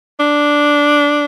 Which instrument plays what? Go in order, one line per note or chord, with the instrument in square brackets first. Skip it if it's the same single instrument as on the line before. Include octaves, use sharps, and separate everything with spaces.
[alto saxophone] D4